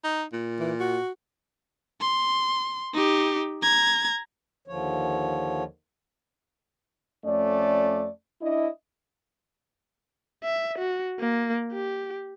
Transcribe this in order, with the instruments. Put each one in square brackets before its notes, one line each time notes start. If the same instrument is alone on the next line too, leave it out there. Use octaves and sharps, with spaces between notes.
[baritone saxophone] D#4
A#2
[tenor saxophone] E3
F#4
[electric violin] C6
D#4 G4
A#5 G#6
[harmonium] D#2 D3 F3 C#5
[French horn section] F2 A3 C#4 D5
D4 E4 D#5
[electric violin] E5
F#4
A#3
G4